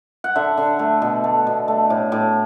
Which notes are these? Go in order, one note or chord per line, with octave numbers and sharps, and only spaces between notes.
F#5
D3 E5
D3
A3
B2
A3
B2
A3
A2
A2